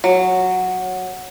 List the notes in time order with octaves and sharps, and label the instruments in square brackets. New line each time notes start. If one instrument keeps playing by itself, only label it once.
[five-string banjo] F#3